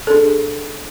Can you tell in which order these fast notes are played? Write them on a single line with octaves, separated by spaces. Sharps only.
A4 D4 G#4